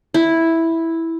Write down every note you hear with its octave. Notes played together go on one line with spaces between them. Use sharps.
E4